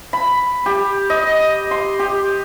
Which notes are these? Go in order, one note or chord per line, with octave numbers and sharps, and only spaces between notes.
B5
G4
D#5
C6
G4